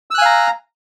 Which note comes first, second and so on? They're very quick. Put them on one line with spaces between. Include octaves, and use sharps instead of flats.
E6 F#6 G#5 F5 A#5